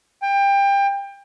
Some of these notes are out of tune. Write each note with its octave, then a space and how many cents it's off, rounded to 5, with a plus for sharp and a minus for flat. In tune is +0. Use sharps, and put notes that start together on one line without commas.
G5 +25